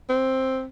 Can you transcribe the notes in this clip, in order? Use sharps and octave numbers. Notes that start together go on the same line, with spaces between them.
C4